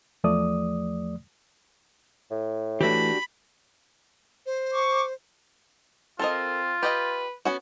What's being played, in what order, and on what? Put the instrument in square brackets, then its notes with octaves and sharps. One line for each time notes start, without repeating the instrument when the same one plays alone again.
[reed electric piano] E2 F3 A3 D5 D#6
[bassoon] A2
[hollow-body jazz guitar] E3 A3 [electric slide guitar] D4 F#4 G4 [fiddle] B5
[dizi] C5
[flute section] C#6 D6
[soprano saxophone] C4 [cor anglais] F4 [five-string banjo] A4 A#4 D#5
[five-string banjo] G4 D#5 G5 [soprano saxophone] B4
[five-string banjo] B3 C#4 F#4